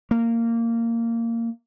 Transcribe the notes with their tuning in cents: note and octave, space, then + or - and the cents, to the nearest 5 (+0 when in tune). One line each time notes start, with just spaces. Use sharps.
A#3 -15